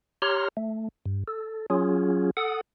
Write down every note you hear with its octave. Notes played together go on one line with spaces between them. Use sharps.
G4 C#5 A#5 C6 F6
A3
G2
A4
F#3 C#4 F4 G#4
A4 F#5 D#6